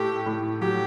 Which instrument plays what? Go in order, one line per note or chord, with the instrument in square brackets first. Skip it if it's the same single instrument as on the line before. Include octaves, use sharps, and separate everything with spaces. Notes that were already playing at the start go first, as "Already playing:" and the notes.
Already playing: [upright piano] A2 A3 [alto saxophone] G4
[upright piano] A2
[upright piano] F#3 [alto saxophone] G4